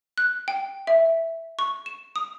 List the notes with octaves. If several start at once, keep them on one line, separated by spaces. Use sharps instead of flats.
F#6
G5
E5
C#6
E7
D#6